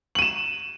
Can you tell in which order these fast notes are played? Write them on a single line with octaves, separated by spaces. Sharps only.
F#7 D#7 E7